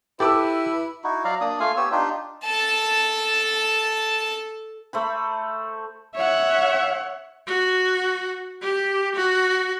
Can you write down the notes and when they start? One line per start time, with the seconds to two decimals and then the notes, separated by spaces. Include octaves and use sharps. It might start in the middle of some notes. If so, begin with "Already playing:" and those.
0.20 E4 G4 A4 B4 D6 E6
1.04 D#4 E4 F#4
1.25 F#3 D5 F5 A#5
1.41 A#3 D4 D5 D#6
1.60 A3 F4 F5 G#5
1.77 B3 G4 C#5 E6
1.92 D4 D#4 F4 G4
2.44 A4 A5
4.93 A3 C5 B5
6.16 C#5 E5 F#5
7.47 F#4
8.62 G4
9.15 F#4